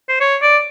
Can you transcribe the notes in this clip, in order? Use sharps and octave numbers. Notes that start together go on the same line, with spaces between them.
C5
C#5
D5